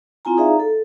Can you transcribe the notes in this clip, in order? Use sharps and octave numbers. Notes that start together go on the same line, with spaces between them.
C4 E4 F4 G#5 A#5
D#4 G#4 D5 E5 F5 A#5
A4